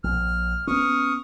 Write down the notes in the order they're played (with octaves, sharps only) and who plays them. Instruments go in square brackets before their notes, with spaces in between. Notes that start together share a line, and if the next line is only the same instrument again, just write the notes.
[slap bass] A#1 [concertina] F6
[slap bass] B3 C#4 [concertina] C#6 D#6 F6